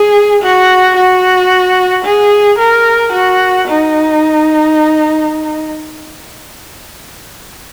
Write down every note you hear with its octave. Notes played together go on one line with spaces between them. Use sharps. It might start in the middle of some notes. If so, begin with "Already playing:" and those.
Already playing: G#4
F#4
F#4
G#4
A#4
F#4
D#4